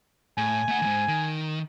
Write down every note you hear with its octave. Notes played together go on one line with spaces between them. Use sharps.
A2 G#5
A3 F#5
E2 G#2
D#3